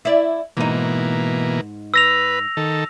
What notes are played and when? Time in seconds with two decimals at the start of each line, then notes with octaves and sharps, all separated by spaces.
0.05 E4 D5
0.57 G#2 B2 E3 A#3 D#4
1.94 B4 E6 A#6 F7
2.57 D#3 A4